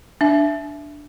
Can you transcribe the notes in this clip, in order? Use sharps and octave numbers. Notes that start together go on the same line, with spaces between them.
D4 E5